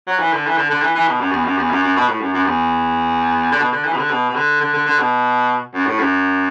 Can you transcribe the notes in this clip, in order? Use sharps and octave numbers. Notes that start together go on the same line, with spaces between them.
F#3
E3
D3
E3
D3
D3
E3
E3
B2
F#2
E2
F#2
E2
F#2
F#2
B2
A2
F#2
F#2
E2
D3
B2
D3
E3
B2
D3
B2
B2
D3
D3
D3
D3
B2
F#2
A2
F#2